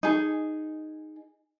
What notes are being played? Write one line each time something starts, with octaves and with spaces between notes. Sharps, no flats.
D#4 G#4